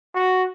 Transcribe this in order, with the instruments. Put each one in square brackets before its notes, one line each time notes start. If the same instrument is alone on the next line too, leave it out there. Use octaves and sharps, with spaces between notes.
[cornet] F#4